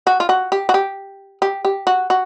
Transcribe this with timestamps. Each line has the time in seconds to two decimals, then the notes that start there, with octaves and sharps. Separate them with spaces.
0.07 F#4
0.20 F4
0.29 F#4
0.52 G4
0.69 F#4
0.74 G4
1.42 G4
1.65 G4
1.87 F#4
2.10 F#4